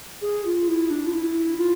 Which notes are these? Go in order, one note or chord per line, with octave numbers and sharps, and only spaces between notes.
G#4
F4
E4
D4
F4
E4
F4